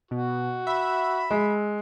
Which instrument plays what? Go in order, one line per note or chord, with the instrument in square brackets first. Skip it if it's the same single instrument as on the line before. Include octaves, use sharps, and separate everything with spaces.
[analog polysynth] B2 [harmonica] F#4
[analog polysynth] E5 [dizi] B5
[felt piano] G#3